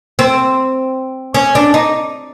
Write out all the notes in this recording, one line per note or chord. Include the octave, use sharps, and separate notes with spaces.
C4
C#4
D4
D#4